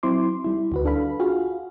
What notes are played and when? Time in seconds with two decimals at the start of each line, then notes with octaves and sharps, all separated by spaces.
0.03 F#3 C4 E4 C6 D6
0.44 G3 E4
0.72 D2 F#4 B4
0.85 D4 A4 F5 B5
1.20 F4 F#4 G#4 F5